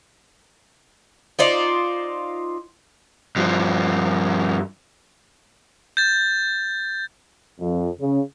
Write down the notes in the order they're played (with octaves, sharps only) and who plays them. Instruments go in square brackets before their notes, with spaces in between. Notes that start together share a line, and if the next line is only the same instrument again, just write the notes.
[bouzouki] D#4 F4 C5 D5
[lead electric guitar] G2 F3
[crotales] G6 A6
[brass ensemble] F2
C#3